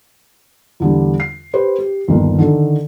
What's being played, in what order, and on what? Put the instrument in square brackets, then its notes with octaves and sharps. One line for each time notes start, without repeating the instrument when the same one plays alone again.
[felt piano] E2 D3 G3
C7
G4 B4 C5
G4
G1 D#2
D3 D#3 A4